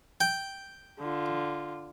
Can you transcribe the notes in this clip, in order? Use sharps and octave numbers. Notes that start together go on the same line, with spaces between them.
G5
D3 F4